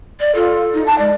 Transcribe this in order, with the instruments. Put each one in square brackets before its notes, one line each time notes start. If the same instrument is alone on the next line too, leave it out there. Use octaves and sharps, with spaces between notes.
[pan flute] D5
[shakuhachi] F4 [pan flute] A4
[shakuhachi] D#4
A5
[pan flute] G#3 [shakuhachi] D5